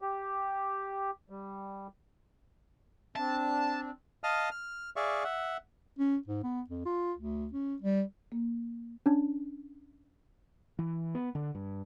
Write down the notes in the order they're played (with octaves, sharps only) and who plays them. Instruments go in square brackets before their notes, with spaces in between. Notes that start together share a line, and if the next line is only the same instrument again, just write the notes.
[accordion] G4
G3
[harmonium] C4 D4 [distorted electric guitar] A5
[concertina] D#5 F5 A5 D#6 F6
F6
G#4 D5 E5 F5 C#6
E5 F#5
[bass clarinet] C#4
G#2
B3
F2
F4
D2
C#4
G3
[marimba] A#3
[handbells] C#4 D4
[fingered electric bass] E3
B3
D3
G2